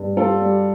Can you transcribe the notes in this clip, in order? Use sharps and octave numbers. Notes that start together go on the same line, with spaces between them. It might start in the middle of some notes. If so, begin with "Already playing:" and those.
Already playing: G2
G3 F4 A4
G3